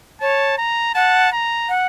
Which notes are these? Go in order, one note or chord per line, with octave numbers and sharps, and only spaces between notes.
C#5 A5
A#5
F#5 A5
A#5
F#5